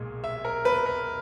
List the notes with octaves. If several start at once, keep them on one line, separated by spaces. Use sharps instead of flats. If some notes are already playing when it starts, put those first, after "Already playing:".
Already playing: B1 A#2 G#3
E5
A#4
B4
A#4